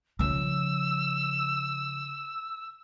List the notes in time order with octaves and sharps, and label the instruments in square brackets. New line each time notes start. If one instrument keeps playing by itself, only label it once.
[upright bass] C#3 F3 [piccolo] E6